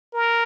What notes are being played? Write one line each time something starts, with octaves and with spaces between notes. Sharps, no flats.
A#4